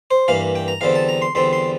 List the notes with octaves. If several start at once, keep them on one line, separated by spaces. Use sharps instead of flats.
C5
G2 E3 A#3 F5
G5
A#5
E2 D3 G3 C4 F5
A5
A#5
C6
E2 D3 G3 C4 C6
C6